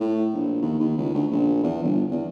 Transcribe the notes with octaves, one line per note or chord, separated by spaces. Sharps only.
A2
A#1
D#2
D#2
C#2
D2
A#1
E2
G1
E2